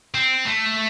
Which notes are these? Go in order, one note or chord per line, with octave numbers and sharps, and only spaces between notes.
C4
A3